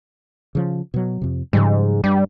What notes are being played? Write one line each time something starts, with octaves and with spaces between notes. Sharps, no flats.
C#3 F3
B2 F#3
F2 C3
G#2 C#3 F3 G3
G2 G3